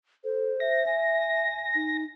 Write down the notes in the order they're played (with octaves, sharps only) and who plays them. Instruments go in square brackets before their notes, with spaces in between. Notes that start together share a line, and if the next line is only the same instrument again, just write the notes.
[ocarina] A4 [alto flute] C5
[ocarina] E5 [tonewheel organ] A#6
[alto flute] G#5
[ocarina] D#4